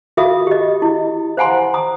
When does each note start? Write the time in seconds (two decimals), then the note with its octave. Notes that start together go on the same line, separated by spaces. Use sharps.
0.17 F4 F#4 A#4 E5 F5 D#6
0.47 G4 D#5
0.82 E4
1.37 C5 F5 F#5 G#5 A#5 C6
1.74 A#5 D#6